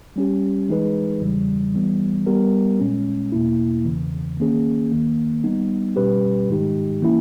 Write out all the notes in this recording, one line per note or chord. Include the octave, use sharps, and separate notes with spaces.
G3 C#4 G4
E3 G#3 D#4 G#4 B4
E2 C#3 E3 G3
E3 G3 B3
G3 B3 G4 A#4
A#2 G#3 C#4
E2 B2 A#3 E4
E2 C#3 E3
D#3 A#3 C#4 G#4
D#2 D#3 A#3
G3 B3 D#4
B2 G3 C#4 G4 B4
G#2 D#3 G#3 D#4 G4
E3 A#3 C#4 E4